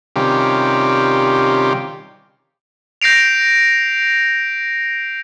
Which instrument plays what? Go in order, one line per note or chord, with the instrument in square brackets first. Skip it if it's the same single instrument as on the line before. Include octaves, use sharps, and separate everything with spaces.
[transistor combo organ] C3 D#3 G3 C#4 F4 G4
[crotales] G6 A#6 C7 D7 F7